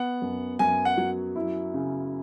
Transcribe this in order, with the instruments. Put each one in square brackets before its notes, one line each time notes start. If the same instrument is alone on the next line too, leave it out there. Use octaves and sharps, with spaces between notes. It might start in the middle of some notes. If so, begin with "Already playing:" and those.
Already playing: [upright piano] B3 [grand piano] F#5
[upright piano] F#2
[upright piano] F#2 [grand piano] G#5
[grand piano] F#5
[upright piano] F#3
E4
C#3